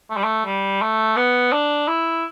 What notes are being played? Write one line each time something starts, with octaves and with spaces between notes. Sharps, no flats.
A3
G3
A3
G3
A3
B3
D4
E4